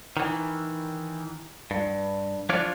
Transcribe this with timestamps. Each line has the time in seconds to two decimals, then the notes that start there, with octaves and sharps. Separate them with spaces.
0.17 D#3 E3
1.71 G2
2.49 F3 D4 F4 C#5 D5